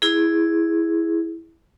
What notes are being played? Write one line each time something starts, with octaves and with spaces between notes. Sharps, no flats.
E4 G#4